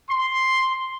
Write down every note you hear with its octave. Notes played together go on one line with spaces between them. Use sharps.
C6